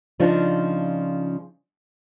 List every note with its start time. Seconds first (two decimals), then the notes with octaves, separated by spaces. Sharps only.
0.20 C#3 F3 D4 D#4 F4